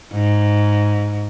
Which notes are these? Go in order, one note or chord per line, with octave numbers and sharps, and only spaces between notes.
G#2